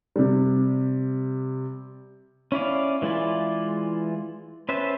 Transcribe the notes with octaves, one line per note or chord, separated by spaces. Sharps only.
C3 G3
C#4 E4 D5 F5
E3 G#3 E4 F4 D5
C#4 B4 C5 E5 A5